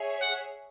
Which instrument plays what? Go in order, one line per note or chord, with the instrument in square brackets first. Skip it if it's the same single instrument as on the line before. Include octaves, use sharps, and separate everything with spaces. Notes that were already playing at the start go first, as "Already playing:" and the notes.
Already playing: [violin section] G#4 C#5 E5
[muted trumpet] F#5